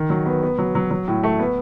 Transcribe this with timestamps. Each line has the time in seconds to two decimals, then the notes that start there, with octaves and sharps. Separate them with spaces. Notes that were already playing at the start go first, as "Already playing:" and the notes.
Already playing: D#3
0.10 F#3
0.26 B3
0.43 B3
0.58 F#3
0.75 F#3
0.91 F#3
1.08 A2
1.23 A3
1.39 B3